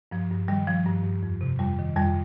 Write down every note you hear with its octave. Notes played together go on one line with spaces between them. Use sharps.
G2 F3
G2
D#3 G3
D#3 F3
G2
G2
F2
C3
F2 G3
D#3
F2 G3